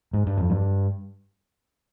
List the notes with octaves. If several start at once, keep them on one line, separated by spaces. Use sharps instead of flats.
G#2
G2
F2
G2